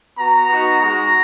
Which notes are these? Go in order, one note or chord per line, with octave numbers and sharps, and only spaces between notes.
B3 F#4 A#5
B3 D#4 F#4
G#3 D#4 F#4 A#5